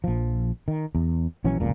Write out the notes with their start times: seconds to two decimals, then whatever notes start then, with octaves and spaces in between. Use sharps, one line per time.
0.04 A#1 F3
0.68 D#3
0.95 E2
1.44 A#1 E3 F#3 C#4
1.60 F1 C#2 A#2